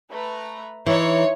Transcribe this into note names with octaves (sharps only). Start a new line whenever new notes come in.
A3 B4 A#5
E3 D#4 C#5 C6